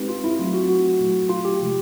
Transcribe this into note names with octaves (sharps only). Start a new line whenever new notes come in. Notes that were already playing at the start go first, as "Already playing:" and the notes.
Already playing: G#3 C4 D#4 G4 B4
F4
E4
F#3 A3 C4 E4 F4
F#4
F#4
A#2 F#3 A3
F4
G4
C3 F3 G#3